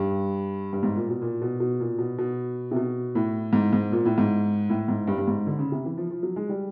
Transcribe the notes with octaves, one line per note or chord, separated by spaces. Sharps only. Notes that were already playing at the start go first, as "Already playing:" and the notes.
Already playing: G2
G2
G#2
A#2
B2
A#2
B2
B2
A#2
B2
B2
C3
B2
A2
G#2
G#2
A#2
A2
G#2
A2
G#2
G2
G2
G#2
D3
C#3
C3
E3
F3
F3
F#3
G#3
G3